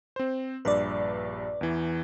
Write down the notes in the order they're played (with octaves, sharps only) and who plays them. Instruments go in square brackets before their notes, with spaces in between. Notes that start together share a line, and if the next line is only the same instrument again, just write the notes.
[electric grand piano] C4 C5
[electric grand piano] A#1 G2 [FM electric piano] B4 D5
[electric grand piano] E2 E3